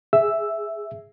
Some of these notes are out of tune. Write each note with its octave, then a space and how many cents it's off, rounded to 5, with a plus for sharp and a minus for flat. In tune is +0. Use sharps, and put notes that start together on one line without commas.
G#4 +0 E5 +0 E6 +0